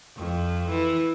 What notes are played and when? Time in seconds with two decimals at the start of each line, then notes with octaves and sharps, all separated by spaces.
0.16 F2
0.68 E3